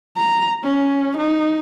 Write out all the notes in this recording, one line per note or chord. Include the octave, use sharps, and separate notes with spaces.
A#5
C#4
D#4